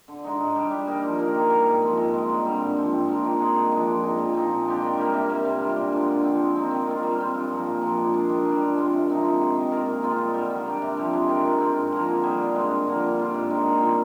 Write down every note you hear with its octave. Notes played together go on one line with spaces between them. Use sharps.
D3
G#3 D#4
G#2
G3 D4 G4
G3
A#3 D#4 G4
F3
A#3 D#4 A#4
D#3
G3 A#3
G#2
F3 C4
G#2
D#3 G#3
G2
D3 G3 C4
G#2
F3 C4
G#2
F3 A#3 D4
D#3
G#3 D#4 G#4
G2
F3 G#3 D4
F3
G#3 D#4
A#2
F3 C4 D#4
A#2
G#3 D4 G4
D#3
G3 A#3
C3
G3 A#3
C3
G3 D4 F4
A#2
G#3 D4
D3
F3 C4
G#3
C4 D#4
D#3
A#3 F4
G3
C4 F4 C5
G2
F3 A#3
A#2
F3 A#3 D4
G#3
D4 G#4
D#3
G3 D4
F3
G#3 C4 F4
C3
F3 C4 D#4
G#3
D#4 G#4
D#3
A#3 F4 A#4
A#2
G#3 C4 F4
G2
D3 G3
D#3
A#3 D4 G4
C3
F3 C4 G4
G#3
D4 G4 A#4
G#3
C4 F4
G#2
F3 A#3
D3
G3 D4 G#4
D3
G#3 C4
G2
D3 F3 A#3
G3
D4 F4
G#2
D#3 G#3 D#4
A#2
G3 C4 F4